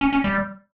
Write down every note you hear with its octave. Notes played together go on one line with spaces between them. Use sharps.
C#4
C#4
G3